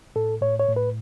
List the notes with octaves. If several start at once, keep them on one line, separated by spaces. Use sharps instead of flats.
A2 A4
A2 C#5
C#5
A2
B4